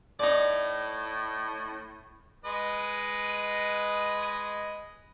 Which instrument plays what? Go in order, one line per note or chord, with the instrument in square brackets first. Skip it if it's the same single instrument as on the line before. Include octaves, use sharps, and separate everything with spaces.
[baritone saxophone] A2 [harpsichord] D#4 D5
[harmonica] G#3 B4 D#5